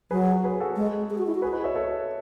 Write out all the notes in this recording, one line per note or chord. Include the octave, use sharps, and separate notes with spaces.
F#3 G#4 B4
G#4 B4
F#4 A4
G#3
G#4
F#4
E4
F#4
G#4 B4
B4 D#5
C#5 E5
A4 C#5